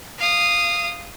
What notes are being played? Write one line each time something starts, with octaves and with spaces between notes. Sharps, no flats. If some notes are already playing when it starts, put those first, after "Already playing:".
F5 D#6